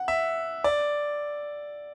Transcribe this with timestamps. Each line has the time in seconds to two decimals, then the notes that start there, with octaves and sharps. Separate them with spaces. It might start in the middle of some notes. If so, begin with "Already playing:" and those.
Already playing: F#5
0.08 E5
0.64 D5